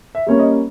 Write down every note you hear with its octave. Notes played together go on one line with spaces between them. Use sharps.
E5
G3 A#3 C#4 C#5
D#5